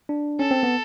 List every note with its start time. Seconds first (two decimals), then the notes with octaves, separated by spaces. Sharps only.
0.09 D4
0.39 C#4 A4
0.51 C4
0.63 B3